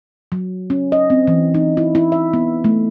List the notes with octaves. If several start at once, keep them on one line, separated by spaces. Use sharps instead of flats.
F#3
C#4
D#5
C4
E3
D#4
E4
E4
E5
B3
A3